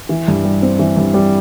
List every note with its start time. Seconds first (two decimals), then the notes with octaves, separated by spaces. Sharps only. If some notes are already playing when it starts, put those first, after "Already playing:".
0.09 E3
0.28 G2
0.45 G3
0.62 C4
0.79 E3
0.97 G2
1.14 G3